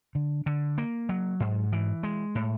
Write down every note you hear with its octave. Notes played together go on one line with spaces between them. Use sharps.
D3
D3
A#3
F#3
G#2
E3
G#3
A2